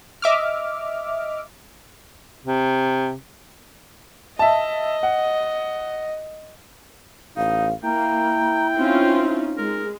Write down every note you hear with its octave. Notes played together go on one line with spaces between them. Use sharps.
D#5 E5 D6 F6
C3
D#5 E5 A5
F#5
A1 D#4 F5
A#3 E4 G5 A#5
C4 C#4 D#4 F4
G#3 A#4